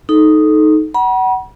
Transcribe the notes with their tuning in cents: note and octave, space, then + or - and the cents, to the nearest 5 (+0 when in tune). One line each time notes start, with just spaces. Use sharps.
D#4 +0 A4 -20
F#5 +25 B5 -45